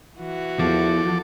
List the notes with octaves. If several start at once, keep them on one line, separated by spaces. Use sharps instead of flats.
E3 F#4
E2 F3 A4 D6